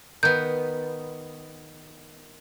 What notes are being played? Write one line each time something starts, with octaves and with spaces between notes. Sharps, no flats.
D#3 B3 G6